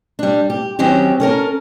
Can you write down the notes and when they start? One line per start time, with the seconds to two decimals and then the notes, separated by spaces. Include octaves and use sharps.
0.19 G3 D4
0.50 G4
0.79 D#3 F#3 C4 C#4 G4
1.20 C#4 A4 A#4